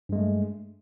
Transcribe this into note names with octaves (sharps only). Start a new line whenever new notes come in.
G2 G#3 A3